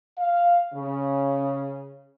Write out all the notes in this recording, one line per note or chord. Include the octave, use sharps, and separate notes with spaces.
F5
C#3